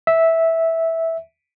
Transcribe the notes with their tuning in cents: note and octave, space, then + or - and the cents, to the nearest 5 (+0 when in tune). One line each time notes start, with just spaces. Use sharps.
E5 -10